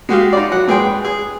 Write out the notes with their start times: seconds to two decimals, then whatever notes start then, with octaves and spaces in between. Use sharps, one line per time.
0.09 G#3 F#4 G4 F5
0.33 D#4 F4 D5
0.52 F#3 F#5
0.68 G#2 G#4 B4 G5 C6
1.05 G#4